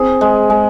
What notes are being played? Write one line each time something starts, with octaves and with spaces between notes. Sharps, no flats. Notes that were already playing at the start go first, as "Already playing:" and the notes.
Already playing: C4 G#4
G#3
G#3